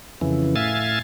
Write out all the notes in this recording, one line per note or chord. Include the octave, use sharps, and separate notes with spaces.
F2 C#3 E3
A2 E5 F5 G#5 A6